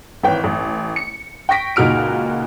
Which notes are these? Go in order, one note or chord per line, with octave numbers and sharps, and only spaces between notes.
G#1 E3 C#5 G5
A1
C#7
G5 C#6 A#6 B6 D7
C#2 A#2 D#4 F#4 F6 D7